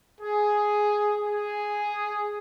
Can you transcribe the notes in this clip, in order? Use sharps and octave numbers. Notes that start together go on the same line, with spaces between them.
G#4
G#4